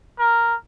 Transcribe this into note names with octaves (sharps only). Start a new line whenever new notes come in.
A#4